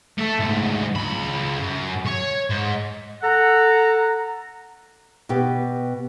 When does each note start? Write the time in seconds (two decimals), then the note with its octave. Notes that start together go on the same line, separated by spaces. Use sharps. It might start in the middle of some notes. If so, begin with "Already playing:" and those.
0.18 A3 A4
0.40 D2 G#2
0.96 C#2 B5
1.60 F#2
2.06 C#5
2.50 G#2
3.22 A4 F#5 A#5
5.29 B2 B3 G4